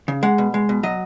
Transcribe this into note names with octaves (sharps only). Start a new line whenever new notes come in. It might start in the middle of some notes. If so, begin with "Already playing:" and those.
C#3
G#3 F#5
B2
G#3
B2
F#3 D#5